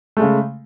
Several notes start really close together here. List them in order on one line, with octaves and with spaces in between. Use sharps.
A3 G#3 C#3